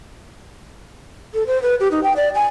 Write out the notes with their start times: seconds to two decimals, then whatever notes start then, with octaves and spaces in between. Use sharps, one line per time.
1.34 A4
1.47 C5
1.62 B4
1.80 G4
1.91 D#4
2.03 G5
2.16 D5
2.35 G#5